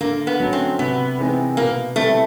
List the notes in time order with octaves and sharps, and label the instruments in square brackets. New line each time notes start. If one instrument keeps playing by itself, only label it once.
[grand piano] D3 [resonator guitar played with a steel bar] A#3
[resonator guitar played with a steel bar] B3
[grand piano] F#3 A3 C#4
[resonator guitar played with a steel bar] C4
[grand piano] C3 [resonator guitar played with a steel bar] B3
[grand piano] E3 G#3 C4 D#4
[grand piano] B2 [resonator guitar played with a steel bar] A#3
[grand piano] G3 C4 E4 [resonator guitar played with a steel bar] A3